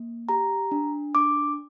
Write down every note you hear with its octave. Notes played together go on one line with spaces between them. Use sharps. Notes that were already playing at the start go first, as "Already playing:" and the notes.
Already playing: A#3
G4 A#5
D4
D4 D6